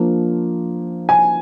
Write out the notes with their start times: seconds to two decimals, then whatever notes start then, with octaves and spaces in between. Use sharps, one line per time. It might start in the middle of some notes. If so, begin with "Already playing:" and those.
Already playing: F3 A#3 D4
1.09 G#5